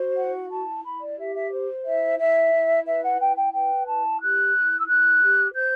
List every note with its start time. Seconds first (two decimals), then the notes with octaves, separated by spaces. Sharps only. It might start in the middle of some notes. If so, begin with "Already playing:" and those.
Already playing: F#4 C5
0.16 E4 F#5
0.50 E4 A5
0.84 E4 B5
1.00 D5
1.17 G4 E5
1.34 E5
1.52 C5
1.85 E4 E5
2.18 E4 E5
2.52 E4
2.86 B4 E5
3.03 F#5
3.19 E4 G5
3.37 G5
3.53 B4 G5
3.87 E4 A5
4.20 G4 F#6
4.54 E4
4.78 E6
4.88 E4 F#6
5.22 G4
5.55 C5 G6